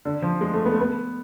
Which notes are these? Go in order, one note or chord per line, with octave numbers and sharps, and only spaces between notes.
D3
F3
G#3
A3
B3
A3
B3